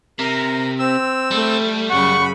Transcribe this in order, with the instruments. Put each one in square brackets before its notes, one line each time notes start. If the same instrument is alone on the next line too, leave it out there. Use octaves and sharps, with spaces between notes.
[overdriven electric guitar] C3 [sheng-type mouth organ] A#4
[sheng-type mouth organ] C4 E6
[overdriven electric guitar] G3 [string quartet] A3
[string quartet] F#2 C#3 B5 [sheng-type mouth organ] F#5 [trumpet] C#6